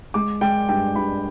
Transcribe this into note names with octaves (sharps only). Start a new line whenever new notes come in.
G#3 D6
G#3 G5
G2 G5
G2 B5